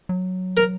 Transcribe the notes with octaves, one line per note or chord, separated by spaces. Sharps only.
F#3
A#4